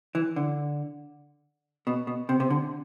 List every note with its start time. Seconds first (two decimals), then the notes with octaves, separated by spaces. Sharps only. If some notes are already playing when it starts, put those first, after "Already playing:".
0.15 E3
0.36 D3
1.87 B2
2.07 B2
2.29 C3
2.40 C3
2.50 D3